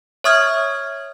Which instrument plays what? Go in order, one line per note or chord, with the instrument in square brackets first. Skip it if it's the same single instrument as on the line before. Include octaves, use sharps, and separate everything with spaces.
[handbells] C#5 E5 C#6 D#6 F6 G#6